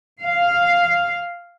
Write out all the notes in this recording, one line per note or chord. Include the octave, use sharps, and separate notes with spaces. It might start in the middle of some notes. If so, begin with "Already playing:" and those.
F5